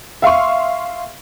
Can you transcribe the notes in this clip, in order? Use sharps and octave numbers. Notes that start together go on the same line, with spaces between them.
E5 F5 C6 C#6